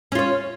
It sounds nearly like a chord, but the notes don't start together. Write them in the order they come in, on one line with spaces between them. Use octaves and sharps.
C#4 F4 C#5